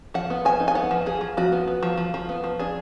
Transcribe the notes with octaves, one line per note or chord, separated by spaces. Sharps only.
F3 F#5
B3
F3 G#5
D#4
G#5
B3 F#5
F3
F3 G#4
F3
F3 F#4
B3
B3
F3
F3
F3
B3
F3
D4 G#4